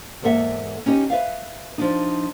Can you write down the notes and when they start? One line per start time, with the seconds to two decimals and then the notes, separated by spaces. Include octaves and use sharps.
0.22 E2 G#2 A#3 A4 E5 F#5
0.86 C#4 D#4 G4 D#5
1.10 B4 D5 E5 F5
1.78 F3 D4 D#4